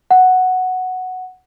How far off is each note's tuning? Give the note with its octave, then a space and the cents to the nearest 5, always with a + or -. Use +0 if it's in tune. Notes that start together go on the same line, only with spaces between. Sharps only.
F#5 +0